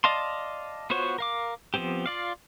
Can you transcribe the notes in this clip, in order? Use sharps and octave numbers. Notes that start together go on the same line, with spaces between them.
D5 D#5 F5 A5 C6
B3 F4 F#4 C5 C#5
A#4 F5 D6
F3 G#3 B3 C4 G4
F4 D5 F5